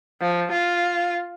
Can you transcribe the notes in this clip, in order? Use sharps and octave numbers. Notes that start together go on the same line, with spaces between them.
F3
F4